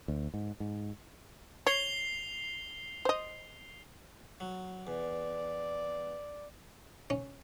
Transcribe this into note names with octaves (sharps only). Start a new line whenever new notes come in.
D2
G#2
G#2
C#5 C7 F7 G7
C5 D#5
F#3
E2 D5
C#4